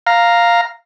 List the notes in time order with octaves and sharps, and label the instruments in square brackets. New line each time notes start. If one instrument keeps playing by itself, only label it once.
[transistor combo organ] F5 A#5